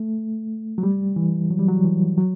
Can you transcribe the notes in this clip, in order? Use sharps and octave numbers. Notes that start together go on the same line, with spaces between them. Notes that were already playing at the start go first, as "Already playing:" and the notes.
Already playing: A3
F#3
G3
E3
F#3
G3
F#3
E3
F#3